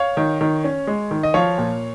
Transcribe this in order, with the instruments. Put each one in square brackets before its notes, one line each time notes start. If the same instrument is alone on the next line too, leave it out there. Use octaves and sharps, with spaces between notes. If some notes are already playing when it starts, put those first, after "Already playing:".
Already playing: [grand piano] C#5 F5
[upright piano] D#3
D#3
C#4
G#3
D#3
[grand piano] D#5
[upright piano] F3 [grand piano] C#5 F5
[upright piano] A#2